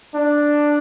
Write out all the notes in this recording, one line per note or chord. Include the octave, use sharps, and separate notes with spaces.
D4